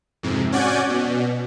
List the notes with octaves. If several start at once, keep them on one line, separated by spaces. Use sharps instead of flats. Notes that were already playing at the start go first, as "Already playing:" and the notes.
F2 G#2 C3
C#4 F#4 D5 F#5 G#5 G6
B2